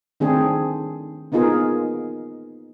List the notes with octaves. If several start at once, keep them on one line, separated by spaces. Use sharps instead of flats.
D#3 A3 C4 D4 G#4
A#3 B3 D#4 F4 G#4 A#4